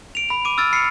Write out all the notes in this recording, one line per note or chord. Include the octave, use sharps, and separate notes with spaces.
D7 F7
B5 F7
D6 D7 D#7
E6 F6 A6 D7
B5 F6 C7 C#7